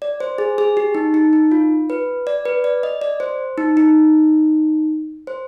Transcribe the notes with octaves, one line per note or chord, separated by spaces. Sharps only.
D5
C5
G#4
G#4
G4
D#4
D#4
D#4
F4
B4
D5
B4
D5
D#5
D5
C5
D#4
D#4
C5